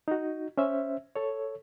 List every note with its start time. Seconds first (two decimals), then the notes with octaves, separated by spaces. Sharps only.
0.08 D#4 F#4
0.58 C#4 C5 E5
1.16 A4 C#5